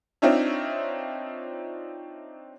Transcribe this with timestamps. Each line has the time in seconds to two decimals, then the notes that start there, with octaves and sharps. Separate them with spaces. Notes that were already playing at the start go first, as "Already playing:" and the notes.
0.22 C4 D4 D#4 F4 C#5 E5